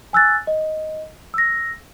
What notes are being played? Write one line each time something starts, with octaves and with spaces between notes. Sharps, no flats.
G#5 E6 F#6 A6
D#5
E6 A#6